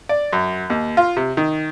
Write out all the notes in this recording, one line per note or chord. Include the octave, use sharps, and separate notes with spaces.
D5
F#2
D#2
F4
C3
D#3